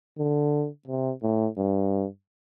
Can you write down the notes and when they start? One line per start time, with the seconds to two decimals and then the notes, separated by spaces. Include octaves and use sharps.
0.18 D3
0.87 C3
1.23 A2
1.57 G2